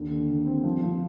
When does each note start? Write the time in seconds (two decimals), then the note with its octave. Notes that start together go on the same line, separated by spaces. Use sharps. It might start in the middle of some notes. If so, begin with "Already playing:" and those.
Already playing: D#2 D3
0.11 D3
0.29 D3
0.46 C4
0.64 F3
0.82 F3